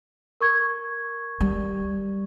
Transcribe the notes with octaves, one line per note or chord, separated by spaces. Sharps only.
A#4 C#6 G#6
G3